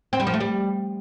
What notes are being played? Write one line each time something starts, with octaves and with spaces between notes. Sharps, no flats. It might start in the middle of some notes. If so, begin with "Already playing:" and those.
C4
G3
F3
A3
G3